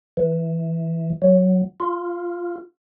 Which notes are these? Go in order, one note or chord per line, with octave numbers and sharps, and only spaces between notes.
E3
F#3
F4